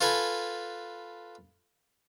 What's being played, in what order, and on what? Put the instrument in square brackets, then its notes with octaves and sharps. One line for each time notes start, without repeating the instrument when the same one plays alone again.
[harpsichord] F4 A4 B4 G#5